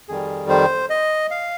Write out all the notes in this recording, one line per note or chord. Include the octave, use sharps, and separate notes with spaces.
F2 D#3 G3 G#4
C5
D#5
F5